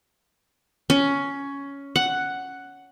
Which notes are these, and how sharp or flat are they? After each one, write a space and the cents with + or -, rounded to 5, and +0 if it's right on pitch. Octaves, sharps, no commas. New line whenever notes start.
C#4 +10
F#5 +5